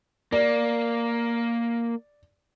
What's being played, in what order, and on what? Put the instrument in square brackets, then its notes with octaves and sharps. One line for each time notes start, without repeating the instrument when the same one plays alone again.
[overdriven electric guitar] A#3 [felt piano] D5